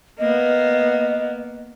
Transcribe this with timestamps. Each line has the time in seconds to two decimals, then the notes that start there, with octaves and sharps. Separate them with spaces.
0.19 A#3 B3 D#5